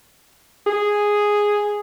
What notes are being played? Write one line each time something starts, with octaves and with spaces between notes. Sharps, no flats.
G#4